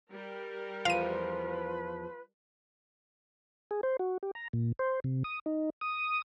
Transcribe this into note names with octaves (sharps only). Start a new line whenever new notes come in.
G3 A#4
E2 F3 F4 B4 F5 D#7
G#4
C5
F#4
G4
A#5
A#2
C5
C3
D#6
D#4
D#6